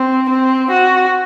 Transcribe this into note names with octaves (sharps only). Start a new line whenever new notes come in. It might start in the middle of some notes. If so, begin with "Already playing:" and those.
Already playing: C4
C4
F#4